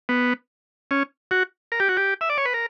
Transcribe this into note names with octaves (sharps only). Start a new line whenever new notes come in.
B3
C#4
F#4
A#4
G4
F#4
G4
E5
D5
C#5
B4
A#4